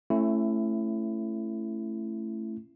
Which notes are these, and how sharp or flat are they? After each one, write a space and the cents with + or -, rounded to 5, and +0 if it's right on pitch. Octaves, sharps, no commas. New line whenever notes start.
A3 +0 C#4 -30 E4 +20